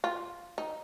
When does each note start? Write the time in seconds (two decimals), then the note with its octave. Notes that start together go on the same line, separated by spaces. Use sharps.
0.04 F4
0.58 D#4